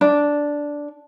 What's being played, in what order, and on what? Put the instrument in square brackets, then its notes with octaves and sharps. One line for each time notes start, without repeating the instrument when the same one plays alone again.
[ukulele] D4